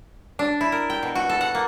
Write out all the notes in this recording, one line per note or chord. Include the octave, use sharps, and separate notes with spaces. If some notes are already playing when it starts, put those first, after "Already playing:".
D4
E4
A#4
G5
B2
F#4
A4
F#5
A#3